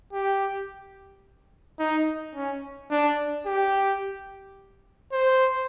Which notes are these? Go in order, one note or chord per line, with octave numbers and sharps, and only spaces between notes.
G4
D#4
C#4
D4
G4
C5